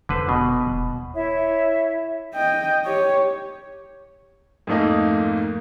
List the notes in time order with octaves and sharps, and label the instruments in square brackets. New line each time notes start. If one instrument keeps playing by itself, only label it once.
[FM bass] F1 [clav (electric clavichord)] D3 B4 C5
[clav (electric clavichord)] B2
[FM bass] D#1
[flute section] E4 C#5 E5
[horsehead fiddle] D#5 G5
G4 C#5
[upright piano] F2 G#2 A3 A#3 D#4